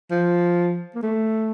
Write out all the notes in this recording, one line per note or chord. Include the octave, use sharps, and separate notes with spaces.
F3
A#3
A3